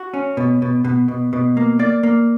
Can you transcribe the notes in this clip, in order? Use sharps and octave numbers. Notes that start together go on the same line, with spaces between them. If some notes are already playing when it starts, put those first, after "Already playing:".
Already playing: F#4
C#4
B2
B2
B2
B2
B2
A#3
A#3 D5
A#3